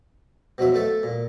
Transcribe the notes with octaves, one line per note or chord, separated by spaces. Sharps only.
B2 F3 F#3 E5
A3 A4 E5
A#2